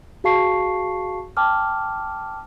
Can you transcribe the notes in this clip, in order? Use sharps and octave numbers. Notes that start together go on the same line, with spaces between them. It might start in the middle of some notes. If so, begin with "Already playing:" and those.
F#4 G#4 F5 A5 C#6 C7
G5 A5 D6 F6